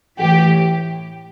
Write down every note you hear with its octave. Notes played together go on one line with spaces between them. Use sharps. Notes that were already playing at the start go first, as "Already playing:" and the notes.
A2 E3 G4